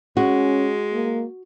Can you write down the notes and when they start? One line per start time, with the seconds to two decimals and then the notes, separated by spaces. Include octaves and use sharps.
0.17 G#3 C#4 F#4
0.93 A#3